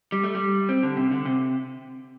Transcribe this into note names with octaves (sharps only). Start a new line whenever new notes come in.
G3
A3
G3
C4
D3
C3
D3
C3